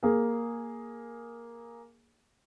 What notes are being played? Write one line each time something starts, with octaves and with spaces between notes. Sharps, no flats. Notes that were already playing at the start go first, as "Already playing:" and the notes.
A#3 G#4